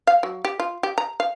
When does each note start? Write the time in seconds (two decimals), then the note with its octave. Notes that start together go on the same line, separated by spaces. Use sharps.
0.07 F5
0.23 F#3
0.45 G4
0.60 F4
0.83 G4
0.98 A#5
1.20 F5